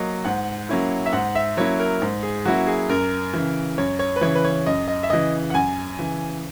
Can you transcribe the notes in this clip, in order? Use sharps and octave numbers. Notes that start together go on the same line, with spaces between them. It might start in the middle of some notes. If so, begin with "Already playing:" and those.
Already playing: F#3 A#3 D#5
G#2 F#5
F#3 A#3 C#4 E4
E5
G#2 F#5
E5
F#3 A#3 C#4 E4 C#5
A#4
G#2
G#4
F#3 A#3 C#4 E4 F#4
G#4
F#2 A#4
C#3 E3
F#2 C#5
C#5
B4
C#3 E3 C#5
B4
C#5
F#2 D#5
D#5
E5
C#3 E3 D#5
F#5
F#2 G#5
C#3 E3